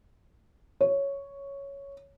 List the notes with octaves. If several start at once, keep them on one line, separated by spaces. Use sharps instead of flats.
C#5